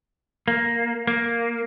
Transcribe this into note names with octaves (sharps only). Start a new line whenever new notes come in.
A#3
A#3